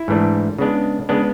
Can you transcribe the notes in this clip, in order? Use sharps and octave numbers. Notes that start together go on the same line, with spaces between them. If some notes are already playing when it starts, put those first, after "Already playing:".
Already playing: E4
G#2 E3 A3 D4
C#3 G#3 B3 D4
C#3 G#3 B3 D4